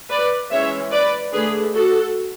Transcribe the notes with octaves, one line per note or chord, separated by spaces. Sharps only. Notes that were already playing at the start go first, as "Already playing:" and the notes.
B4 D5
E3 G#3 C#4 C#5 E5
B4 D5
D3 A3 D4 G#4 B4
F#4 A4